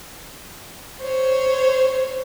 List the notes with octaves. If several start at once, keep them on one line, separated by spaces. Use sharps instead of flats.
C5 C#5